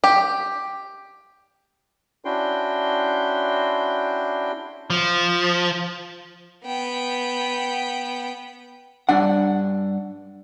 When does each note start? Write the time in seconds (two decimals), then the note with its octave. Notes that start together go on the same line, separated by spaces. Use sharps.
0.04 G4
2.25 C#4 D4 E4 F#4 G5 C6
4.90 F3
6.65 B3 G5
9.09 G2 D4 F#5